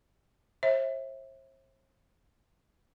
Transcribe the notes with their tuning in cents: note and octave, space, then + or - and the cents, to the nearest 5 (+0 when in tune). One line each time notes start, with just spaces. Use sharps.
C5 +45 E5 -15